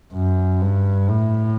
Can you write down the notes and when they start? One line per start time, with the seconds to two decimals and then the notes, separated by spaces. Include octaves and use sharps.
0.14 F#2
0.62 G2
1.09 A2